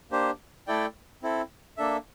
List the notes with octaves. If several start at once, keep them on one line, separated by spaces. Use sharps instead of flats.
A#3 D4 G4 C5
A3 E4 A4 D5 G5
C4 E4 A4
A#3 D4 A4 E5